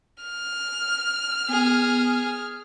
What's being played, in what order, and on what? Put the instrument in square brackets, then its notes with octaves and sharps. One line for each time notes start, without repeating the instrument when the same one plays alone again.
[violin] F6
[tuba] B3 [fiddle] G#4